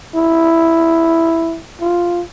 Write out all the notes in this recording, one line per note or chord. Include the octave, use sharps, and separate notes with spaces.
E4
F4